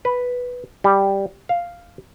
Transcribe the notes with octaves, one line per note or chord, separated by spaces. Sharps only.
B4
G3
F5